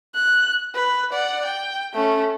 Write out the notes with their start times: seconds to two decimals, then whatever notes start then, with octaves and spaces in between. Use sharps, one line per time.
0.15 F#6
0.75 B4
1.13 D5 F#5
1.45 G5
1.94 A3 C#4